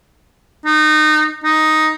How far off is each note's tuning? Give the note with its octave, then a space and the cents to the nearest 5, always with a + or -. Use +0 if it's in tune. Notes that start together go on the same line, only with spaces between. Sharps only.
D#4 -25
D#4 +5